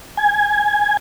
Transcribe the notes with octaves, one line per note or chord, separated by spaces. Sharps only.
G#5